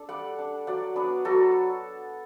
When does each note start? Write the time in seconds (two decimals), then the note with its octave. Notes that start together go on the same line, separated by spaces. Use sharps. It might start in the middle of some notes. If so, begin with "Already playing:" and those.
Already playing: D4 A4
0.09 G3 D5 F#5
0.39 D4
0.67 F#3 D5 F#5
0.96 B3 D4
1.25 F#3 F#4 A4